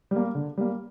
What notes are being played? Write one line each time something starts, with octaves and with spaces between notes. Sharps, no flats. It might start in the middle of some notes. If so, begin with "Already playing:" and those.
G3 A#3
D3
G3 A#3